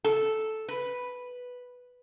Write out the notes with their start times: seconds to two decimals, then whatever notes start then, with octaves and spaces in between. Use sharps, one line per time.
0.04 A4
0.68 B4